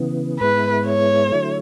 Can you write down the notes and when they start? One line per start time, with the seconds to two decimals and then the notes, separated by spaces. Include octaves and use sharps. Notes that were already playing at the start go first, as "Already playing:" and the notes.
Already playing: C#3 E3 B3
0.40 G#2 G#3 B3 E4 B4
0.86 C#5
1.32 D3 F#3 A3 E4